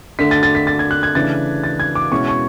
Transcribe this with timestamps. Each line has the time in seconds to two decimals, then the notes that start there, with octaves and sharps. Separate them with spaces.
0.19 D3 A3 D4 B6
0.31 A6
0.43 A6
0.55 B6
0.67 A6
0.79 G#6
0.91 F#6
1.03 G#6
1.15 C#3 E3 A3 D4 A6
1.64 A6
1.80 G#6
1.95 D6
2.12 B2 G#3 C#4 E4 C#6
2.28 C#6